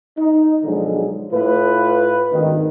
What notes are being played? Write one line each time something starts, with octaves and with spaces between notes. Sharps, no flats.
D#4
B1 D3 F3 F#3 G#3
A2 F4 B4
G#1 D2 D#3